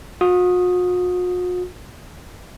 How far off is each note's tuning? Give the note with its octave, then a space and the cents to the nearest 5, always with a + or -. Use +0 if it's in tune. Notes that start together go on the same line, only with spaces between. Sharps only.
F#4 -45 D#6 +0